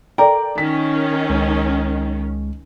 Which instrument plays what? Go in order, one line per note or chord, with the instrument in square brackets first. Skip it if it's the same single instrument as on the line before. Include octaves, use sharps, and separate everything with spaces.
[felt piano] A4 D5 G5 [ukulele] A#4
[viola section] D#3 C#4 [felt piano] B6
[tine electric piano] C#2 G#3